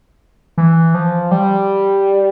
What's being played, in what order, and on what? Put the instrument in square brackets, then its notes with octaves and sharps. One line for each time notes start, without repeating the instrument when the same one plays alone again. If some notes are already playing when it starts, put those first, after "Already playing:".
[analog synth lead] E3
F3
G3